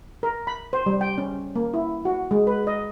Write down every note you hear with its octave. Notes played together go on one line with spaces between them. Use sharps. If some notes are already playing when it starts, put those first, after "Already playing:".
A#4
B5
C5
G3
G5
C#4
A#3
E4
F#4
G#3
B4
D#5